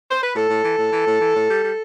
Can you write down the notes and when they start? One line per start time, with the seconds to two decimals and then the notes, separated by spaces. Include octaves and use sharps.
0.11 C5
0.24 B4
0.36 A2 A4
0.50 A2
0.65 E3
0.79 A2
0.93 E3
1.07 A2
1.21 E3
1.36 A2
1.51 G3
1.64 G3